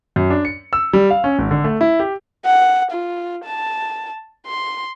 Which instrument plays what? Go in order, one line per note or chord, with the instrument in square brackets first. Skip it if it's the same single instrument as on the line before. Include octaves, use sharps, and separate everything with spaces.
[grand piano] F#2
D4
C#7
E6
G3
F5
C#4
G#1
D3
A3
E4
G4
[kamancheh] F#5
F4
A5
C6